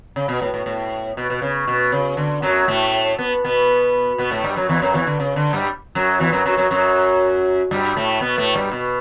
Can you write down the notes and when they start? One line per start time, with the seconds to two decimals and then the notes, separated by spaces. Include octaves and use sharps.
0.16 C#3
0.28 B2
0.42 A2
0.54 A2
0.66 A2
1.17 B2
1.30 B2
1.42 C#3
1.67 B2
1.92 C#3
2.17 D3
2.42 F#2 F#3
2.68 A2 A3
3.19 B3
3.44 B2 B3
4.18 B2 B3
4.31 A2 A3
4.44 G2 G3
4.56 F#2 F#3
4.69 E2 E3
4.82 F#2 F#3
4.94 E2 E3
5.07 D3
5.20 C#3
5.36 D3
5.53 G2 G3
5.95 F#2 F#3
6.20 E2 E3
6.32 F#2 F#3
6.45 F#2 F#3
6.57 F#2 F#3
6.71 F#2 F#3
7.71 G2 G3
7.97 A2 A3
8.21 B2 B3
8.38 A2 A3
8.55 G2 G3
8.72 B2